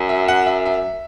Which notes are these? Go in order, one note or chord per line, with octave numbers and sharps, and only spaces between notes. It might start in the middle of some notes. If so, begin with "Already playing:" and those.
Already playing: F#2
E5
F#5
E5
E5